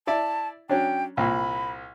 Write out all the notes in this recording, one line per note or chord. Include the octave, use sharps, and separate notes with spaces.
E4 D5 E5 A5
F#3 C#4 D4 G5
C2 A#2 B5